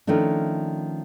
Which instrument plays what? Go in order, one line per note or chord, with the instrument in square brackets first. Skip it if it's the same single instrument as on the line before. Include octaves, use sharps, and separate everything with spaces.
[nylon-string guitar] D#3 F3 A3 C#4 D4